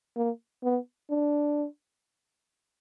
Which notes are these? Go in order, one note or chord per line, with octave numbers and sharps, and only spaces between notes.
A#3
B3
D4